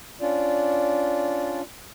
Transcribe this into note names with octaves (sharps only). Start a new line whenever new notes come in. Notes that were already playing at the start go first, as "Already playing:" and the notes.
C#4 D4 F4 D5